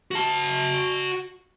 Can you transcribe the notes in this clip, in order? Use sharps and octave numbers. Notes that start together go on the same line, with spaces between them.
F#4 A5